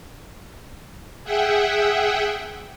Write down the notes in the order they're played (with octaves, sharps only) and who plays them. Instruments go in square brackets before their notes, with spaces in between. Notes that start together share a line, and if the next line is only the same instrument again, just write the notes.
[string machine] G#4 E5 F#5 G5